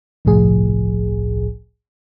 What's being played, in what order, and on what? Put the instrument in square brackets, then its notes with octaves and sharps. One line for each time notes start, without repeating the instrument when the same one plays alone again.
[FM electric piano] G1 C2 A2 F3 G#4